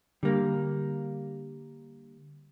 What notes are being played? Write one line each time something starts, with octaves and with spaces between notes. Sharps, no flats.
D3 G3 A#3